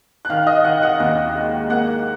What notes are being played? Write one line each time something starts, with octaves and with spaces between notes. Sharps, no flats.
F#6
D#3 F5 F6
D#5 D#6
D#3 F#5 F#6
F#5 F#6
D#2 F#5 F#6
G#3
A#3 F#5 F#6